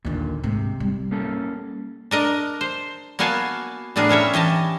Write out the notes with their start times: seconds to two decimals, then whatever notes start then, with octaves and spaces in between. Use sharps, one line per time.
0.05 D#2 A#2 D3
0.44 G#2 C3
0.80 G3
1.11 A#3 C#4 A4
2.11 D4 A#4 D#5
2.61 C5
3.19 A#3 B3 F#4 F5 G#5 A5
3.96 A2 B3 D4 G#4 A#4
4.09 G3 C#4 C#5 E5
4.34 E3 G4 D#5 A5